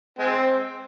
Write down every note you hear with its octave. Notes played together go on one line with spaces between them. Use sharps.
G#3 C4